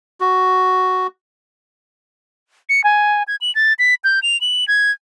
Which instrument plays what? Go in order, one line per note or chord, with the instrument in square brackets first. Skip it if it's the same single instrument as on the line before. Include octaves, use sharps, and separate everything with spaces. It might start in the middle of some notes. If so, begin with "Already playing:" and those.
[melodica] F#4
[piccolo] C#7
G#5
G#6
F#7
A6
B6
G6
F7
F#7
G#6